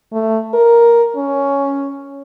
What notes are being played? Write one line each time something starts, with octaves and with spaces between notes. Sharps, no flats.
A3
A#4
C#4